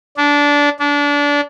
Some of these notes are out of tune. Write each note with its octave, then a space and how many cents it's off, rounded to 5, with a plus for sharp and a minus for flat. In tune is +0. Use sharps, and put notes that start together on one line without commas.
D4 -20
D4 -25